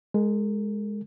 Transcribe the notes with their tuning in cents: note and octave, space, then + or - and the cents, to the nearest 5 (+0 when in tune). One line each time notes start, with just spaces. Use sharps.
G#3 +0 A#4 -40